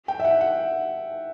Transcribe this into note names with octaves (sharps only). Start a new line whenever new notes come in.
G5
E5
F#5
F#5